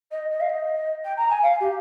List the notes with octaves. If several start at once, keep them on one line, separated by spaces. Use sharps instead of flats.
D#5
D#5
F5
D#5
G5
A#5
G#5
F5
G4